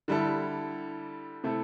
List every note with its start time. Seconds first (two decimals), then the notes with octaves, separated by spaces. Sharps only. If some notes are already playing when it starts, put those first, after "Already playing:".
0.08 D3 G3 E4 A4
1.44 C3 A3 E4 A4